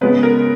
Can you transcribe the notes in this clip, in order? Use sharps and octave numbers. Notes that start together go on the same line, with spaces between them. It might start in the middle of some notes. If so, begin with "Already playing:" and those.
C#3 G#3 B3 B4
A#4